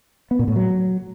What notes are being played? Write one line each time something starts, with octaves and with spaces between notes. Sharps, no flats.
B3
A#2
A2
F#3